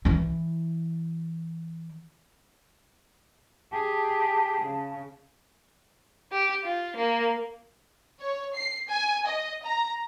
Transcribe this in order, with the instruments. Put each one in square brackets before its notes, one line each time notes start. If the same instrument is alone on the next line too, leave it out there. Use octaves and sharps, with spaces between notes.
[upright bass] E3 E4
[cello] G4 G#4 [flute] A5
[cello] C#3
[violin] G4
F4
A#3
[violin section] C#5
C7
G#5
D#5
A#5